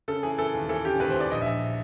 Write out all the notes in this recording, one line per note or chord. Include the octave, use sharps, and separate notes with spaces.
C#3 A4
E3 G#4
E3 A4
D#2
E3 A4
C#3 G4
D#2 B4
C5
E3 D5
A#1 D#5
E5
A#1